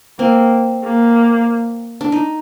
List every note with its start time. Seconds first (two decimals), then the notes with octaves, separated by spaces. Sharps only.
0.19 A#3 C4
0.84 A#3
2.01 D4
2.12 D#4